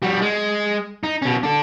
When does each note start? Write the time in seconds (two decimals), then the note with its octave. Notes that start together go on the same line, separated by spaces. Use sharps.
0.02 G3 F#4
0.21 G#3
1.04 D#4
1.22 B2 C#4
1.43 D4 A4